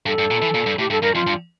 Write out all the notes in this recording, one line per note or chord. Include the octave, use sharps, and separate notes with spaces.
G2 A4
G2
A#2
E3
A#2
G2
A2 G4
G2 A4
G2 A#4
F2 F4
G2